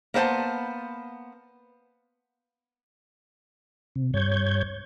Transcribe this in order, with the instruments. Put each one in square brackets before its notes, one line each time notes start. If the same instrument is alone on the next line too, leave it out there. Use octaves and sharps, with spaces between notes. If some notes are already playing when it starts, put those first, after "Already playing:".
[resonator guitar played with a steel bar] A#3 B3 C5 F#5 A5
[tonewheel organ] C3
G2 C#5 G6 G#6